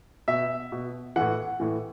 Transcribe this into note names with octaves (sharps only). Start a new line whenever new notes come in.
B2 E5
B2
A2 E3 F#5
A2 E3